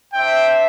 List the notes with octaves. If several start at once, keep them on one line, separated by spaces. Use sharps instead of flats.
D4 C5 E5 G5